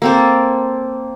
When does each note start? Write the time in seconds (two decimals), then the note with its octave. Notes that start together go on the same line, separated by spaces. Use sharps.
0.02 A#3 C4 A4